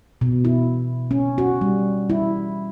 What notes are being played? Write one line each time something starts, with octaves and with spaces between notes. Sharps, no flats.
B2
E4
C#4
F#4
G3
E4